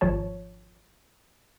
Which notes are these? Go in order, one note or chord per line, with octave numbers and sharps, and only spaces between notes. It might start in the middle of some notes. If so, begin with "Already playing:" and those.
G#1 F3 C#5 A5